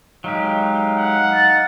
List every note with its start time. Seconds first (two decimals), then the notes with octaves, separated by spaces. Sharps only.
0.24 F#3 G#3 D#4 G4 F5
0.98 F#5
1.33 A6